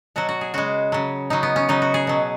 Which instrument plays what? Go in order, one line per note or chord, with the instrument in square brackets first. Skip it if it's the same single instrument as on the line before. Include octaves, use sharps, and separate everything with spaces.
[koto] B2 F#3 F#4
F#4
G#4
C#3 G#3 F#4
C#3 F#3
C#3 F#3 D#4
B3
C#4
C#3 F#3 D#4
F#4
G#4
B2 F#3